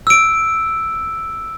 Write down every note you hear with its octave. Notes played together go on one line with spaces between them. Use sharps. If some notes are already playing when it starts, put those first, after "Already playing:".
E6 D7